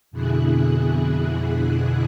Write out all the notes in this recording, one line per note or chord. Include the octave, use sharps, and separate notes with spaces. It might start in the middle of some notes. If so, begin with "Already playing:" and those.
F2 B2 D3 E4 G#4 F#6